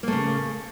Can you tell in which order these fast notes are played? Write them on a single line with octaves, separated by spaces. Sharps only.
A#3 A3 C#3